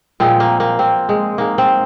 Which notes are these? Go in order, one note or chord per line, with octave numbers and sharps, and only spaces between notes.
A#2 F3 G#3 C4
A#3
A#3
C4
G#3
G#2 G#3 A#3
C4